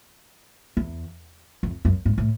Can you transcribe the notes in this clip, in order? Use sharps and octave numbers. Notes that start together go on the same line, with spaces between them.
E2
F2
F#2
G#2
A2